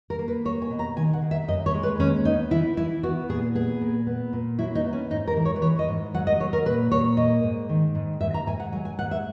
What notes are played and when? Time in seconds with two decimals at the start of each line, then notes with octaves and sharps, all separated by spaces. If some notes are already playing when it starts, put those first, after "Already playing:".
0.10 A#4
0.19 A#3
0.28 B4
0.45 A#3 C#5
0.62 G#5
0.70 B2
0.79 A#5
0.96 D#3 G#5
1.13 F#5
1.22 D#3
1.31 E5
1.48 F#2 D#5
1.66 C#5
1.74 G#3
1.83 B4
1.99 D#2 C#4
2.25 B3 D#4
2.51 E3 E4
2.77 E3 E4
3.03 B3 F#4
3.29 A#2 G#4
3.55 B3 G#4
3.81 A#2
4.07 B3
4.33 A#2
4.59 F#3 E4
4.75 D#4
4.84 B3
4.93 C#4
5.10 G#2 D#4
5.27 A#4
5.37 E3
5.45 C#5
5.56 B4
5.61 E3 C#5
5.79 D#5
5.89 G#2
6.14 F#3 F#5
6.27 D#5
6.40 F#3 C#5
6.53 A#4
6.66 A#2 B4
6.92 A#2 C#5
7.17 A#3 D#5
7.43 G#2
7.69 D#3
7.95 G#2
8.21 G#2 E5
8.34 A#5
8.46 G#2 G#5
8.60 F#5
8.73 F#3 G#5
8.85 G#5
8.99 G#2 F#5
9.11 E5